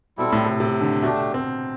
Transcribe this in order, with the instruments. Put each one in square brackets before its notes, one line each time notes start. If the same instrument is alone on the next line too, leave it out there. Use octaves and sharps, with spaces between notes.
[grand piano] B2 [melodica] G3 C4 E4 A4
[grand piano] A2
C3
C3
D3
[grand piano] B2 [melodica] A3 D4 G4
[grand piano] C4